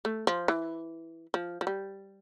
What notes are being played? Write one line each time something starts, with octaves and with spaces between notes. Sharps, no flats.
A3
F3
E3
F3
F3
G3